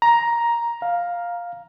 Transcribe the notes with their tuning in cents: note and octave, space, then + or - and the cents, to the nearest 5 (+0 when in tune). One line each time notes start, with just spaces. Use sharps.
A#5 +10
F5 +5